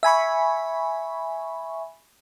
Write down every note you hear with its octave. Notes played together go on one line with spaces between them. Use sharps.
E5 G#5 B5 C#6